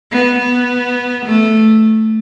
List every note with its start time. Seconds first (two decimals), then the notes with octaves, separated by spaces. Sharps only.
0.12 B3
0.39 B3
1.26 A3